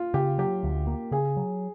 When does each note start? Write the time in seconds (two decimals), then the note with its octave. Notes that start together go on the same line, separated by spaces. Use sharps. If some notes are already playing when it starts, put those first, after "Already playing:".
Already playing: F4
0.14 C#3 G4
0.38 F#3 G4
0.63 D2
0.87 A#3
1.11 C#3 G#4
1.37 F#3